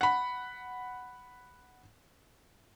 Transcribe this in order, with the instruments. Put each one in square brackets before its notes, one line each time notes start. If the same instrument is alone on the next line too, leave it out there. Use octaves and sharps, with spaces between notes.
[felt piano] F#5 B5